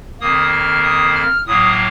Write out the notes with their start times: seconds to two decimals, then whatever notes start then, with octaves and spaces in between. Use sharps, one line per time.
0.20 F2 D#3 A#3 D#6
0.53 F6
0.84 D#6
1.16 F6
1.47 A2 F#3 A#3 D#6